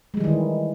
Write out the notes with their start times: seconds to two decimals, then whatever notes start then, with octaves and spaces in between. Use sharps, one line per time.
0.14 G#3
0.17 G3
0.21 E3
0.24 D#3